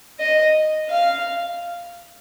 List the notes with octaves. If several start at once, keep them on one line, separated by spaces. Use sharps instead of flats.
D#5
F5